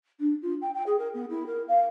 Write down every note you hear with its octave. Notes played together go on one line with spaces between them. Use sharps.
D4
F4
G5
G5
G#4
A#4
B3
E4
A#4
F5